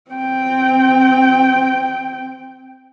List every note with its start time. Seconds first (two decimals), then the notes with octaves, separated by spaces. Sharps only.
0.11 C4 G5